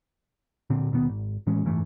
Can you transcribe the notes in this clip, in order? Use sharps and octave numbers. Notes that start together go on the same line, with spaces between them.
D1 A#2 D3 C4
D#1 B2 D#3 B3
G#1
A2 E3 G#3 C#4
F#1 G#2 E3 A3